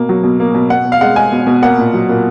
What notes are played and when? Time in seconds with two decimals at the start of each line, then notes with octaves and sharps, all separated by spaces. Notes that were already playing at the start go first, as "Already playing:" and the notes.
Already playing: B2 A#3
0.09 F#3
0.24 B2
0.40 A#3
0.55 B2
0.70 B2 F#5
0.85 B2
0.92 F5
1.01 G#3 F#5
1.16 G#3 G#5
1.32 B2
1.47 B2
1.62 A#3 F#5
1.78 A#2
1.94 F#3
2.09 A#2